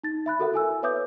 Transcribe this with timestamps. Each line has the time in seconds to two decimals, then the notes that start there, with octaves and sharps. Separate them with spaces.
0.04 D#4 A6
0.26 E5 B5 F#6
0.40 F#4 A4 A#4 E5 F#5
0.52 E4 A4 G#5 E6
0.83 B4 C#5 E5 D6 D#6 G6